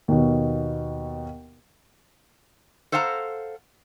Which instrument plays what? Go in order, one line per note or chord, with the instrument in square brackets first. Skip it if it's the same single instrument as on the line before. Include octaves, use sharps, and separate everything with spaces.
[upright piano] D#2 B2
[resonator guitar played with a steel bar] A4 C5 F5 F#5 A5 A#5